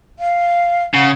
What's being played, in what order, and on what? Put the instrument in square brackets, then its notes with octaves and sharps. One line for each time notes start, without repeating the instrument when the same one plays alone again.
[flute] F5
[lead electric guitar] C#3 [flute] F#5